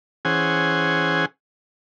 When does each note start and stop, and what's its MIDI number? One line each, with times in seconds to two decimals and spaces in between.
0.25 1.25 52
0.25 1.25 61
0.25 1.25 68
0.25 1.25 72
0.25 1.25 78
0.25 1.25 80